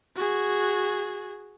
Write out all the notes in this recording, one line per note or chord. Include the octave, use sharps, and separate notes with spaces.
F#4 G#4